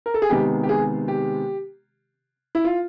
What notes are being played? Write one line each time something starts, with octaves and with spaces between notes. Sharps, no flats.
A#4
A4
G#4
C3 D#3 G#3 B3 G4
G4
G#4
G4
E4
F4